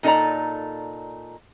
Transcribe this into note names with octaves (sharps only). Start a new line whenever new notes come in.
A#2 D#4 A4 D5 A#5